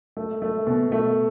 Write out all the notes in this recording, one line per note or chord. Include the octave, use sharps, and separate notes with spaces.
A3
A3
B2
A3